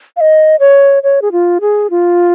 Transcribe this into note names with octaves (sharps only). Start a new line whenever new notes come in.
F5
D#5
C#5
C#5
G#4
F4
G#4
F4